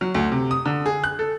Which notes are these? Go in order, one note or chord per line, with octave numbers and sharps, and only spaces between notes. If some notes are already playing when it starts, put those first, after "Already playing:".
F#3
D2
C3
D#6
D3
G#4
F#6
A4